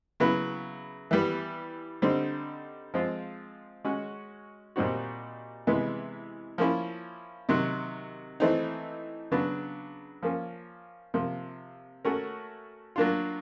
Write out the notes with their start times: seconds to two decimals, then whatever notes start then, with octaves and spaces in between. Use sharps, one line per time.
0.20 C#3 F#3 B3 E4
1.11 E3 G3 B3
2.02 D3 G3 C4 D#4
2.94 F3 G#3 C4 F4
3.84 G#3 C#4 F#4
4.76 A#2 G3 C4 D#4 F#4
5.67 C3 E3 G#3 B3
6.58 F3 A#3 C#4 E4
7.49 C3 D#3 F#3
8.40 E3 A3 C4 D#4
9.31 C#3 F#3 B3 D4
10.23 F3 A#3 C#4
11.14 C3 F3 A#3
12.05 A3 C#4 F#4 A#4
12.96 F#3 A#3 D4 F4